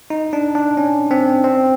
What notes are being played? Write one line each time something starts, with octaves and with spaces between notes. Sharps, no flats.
D#4
D4
D4
C#4
C4
C4